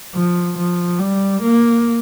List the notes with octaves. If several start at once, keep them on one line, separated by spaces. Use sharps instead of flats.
F3
F3
G3
A#3